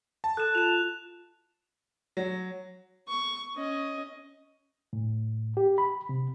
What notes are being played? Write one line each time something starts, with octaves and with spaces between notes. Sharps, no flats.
A5
A4 F#6 E7
F4 E7 F7
F#3
C#6
C#4 D#5
A2
G4
B5
C3